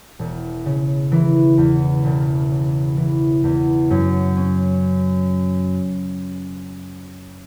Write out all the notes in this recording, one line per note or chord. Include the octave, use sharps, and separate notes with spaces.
E1
C#3
E3
E2
E1
C#3
E3
E2
F#2
C#4